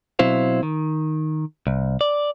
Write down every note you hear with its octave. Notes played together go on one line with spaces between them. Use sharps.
B2 F#3 C4 E4 C5 F5
D#3
C2
D5